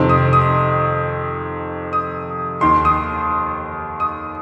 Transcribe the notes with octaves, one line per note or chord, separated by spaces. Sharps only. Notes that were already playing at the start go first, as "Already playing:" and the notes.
Already playing: F2 C3 D#3 C6
D#6
D#6
D#6
D#2 D#3 C6
D#6
D#6